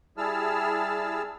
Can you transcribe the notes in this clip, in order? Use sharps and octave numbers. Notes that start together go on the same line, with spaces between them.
G3 E4 G#4 A5 E6 F6